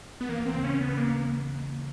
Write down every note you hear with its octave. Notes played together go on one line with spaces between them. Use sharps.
B3
E3 A#3
C4
C#3
C#4
C#3 B3
A#3